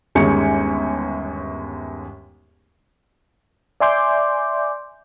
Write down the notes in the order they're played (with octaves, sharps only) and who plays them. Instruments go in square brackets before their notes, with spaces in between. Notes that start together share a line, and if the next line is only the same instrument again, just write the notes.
[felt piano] G1 D#2 G#3 C#4 G#5 C#7
[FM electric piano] D5 E5 G#5 C6 D6 G6